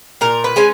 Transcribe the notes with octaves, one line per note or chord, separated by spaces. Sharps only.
A#2 A#4
B4
G#3 C#4 G#5